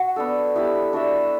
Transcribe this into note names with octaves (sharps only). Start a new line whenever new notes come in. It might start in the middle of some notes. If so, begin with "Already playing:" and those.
Already playing: F#4 F#5
B3 D4 A4
B3 E4 G4 B4
D4 F#4 A4 E5